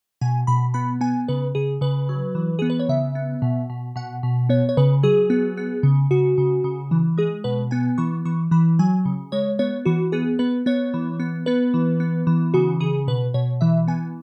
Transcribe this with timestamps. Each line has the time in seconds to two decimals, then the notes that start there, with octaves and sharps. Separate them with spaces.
0.21 B2 G#5
0.47 B2 B5
0.74 B3 B5
1.01 B3 G#5
1.28 C#3 B4
1.55 C#3 G#4
1.81 C#3 B4
2.09 F#3
2.35 E3
2.59 B3 G#4
2.70 B4
2.79 C#5
2.89 C#3 E5
3.15 B3
3.42 B2
3.70 B2
3.96 B2 F#5
4.23 B2
4.49 B3 C#5
4.69 C#5
4.77 C#3 B4
5.03 F#3 G#4
5.30 B3
5.57 B3
5.83 C#3
6.11 C#3 F#4
6.38 C#3
6.64 C#3
6.91 E3
7.17 G#3 G#4
7.44 B2 B4
7.71 B3 G#5
7.98 E3 C#6
8.25 E3 C#6
8.51 E3 B5
8.79 F#3 G#5
9.05 C#3
9.32 G#3 C#5
9.59 B3 C#5
9.85 E3 F#4
10.12 B3 G#4
10.39 B3 B4
10.66 B3 C#5
10.94 E3
11.20 B3
11.46 B3 B4
11.74 E3
12.00 B3
12.27 E3
12.54 C#3 F#4
12.80 C#3 G#4
13.08 B2 B4
13.34 B2 C#5
13.61 E3 E5
13.87 B3 G#5